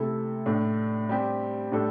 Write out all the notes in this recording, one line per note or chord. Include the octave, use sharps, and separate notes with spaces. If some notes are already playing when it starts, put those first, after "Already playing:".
Already playing: C3 A3 E4 A4
A2 A3 D4
G3 C4 G4
A2 G3 D4 A4